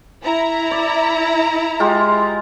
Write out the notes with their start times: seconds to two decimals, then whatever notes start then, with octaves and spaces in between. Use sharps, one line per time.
0.24 E4 A#5
0.71 D5
1.80 G#3 F4 G4